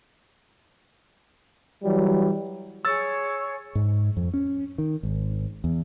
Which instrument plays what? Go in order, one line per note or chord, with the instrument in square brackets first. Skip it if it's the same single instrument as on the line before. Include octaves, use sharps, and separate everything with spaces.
[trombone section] E3 F#3 G3
[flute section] G#4 C#5 C#6 [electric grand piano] E6 A6
[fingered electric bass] G#2
F2
C#4
D#3
G#1
E2